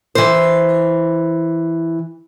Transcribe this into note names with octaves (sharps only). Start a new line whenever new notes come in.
E3 C5